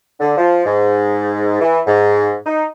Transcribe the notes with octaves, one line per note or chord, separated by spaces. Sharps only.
D3
F3
G#2
E3
G#2
D#4